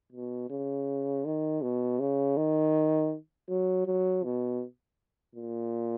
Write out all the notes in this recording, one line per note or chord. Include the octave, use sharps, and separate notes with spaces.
B2
C#3
D#3
B2
C#3
D#3
F#3
F#3
B2
A#2